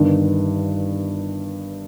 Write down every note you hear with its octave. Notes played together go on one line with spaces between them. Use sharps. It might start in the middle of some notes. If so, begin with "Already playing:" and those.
Already playing: G1 G2 D#3